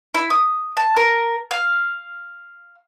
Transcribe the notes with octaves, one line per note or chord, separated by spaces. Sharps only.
E4
D#6
A5
A#4
F5